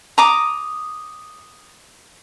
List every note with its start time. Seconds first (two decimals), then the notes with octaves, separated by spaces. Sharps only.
0.18 A#5 D6 D#6